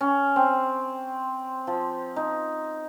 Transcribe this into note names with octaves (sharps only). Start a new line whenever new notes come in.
C#4
C4
F3
D#4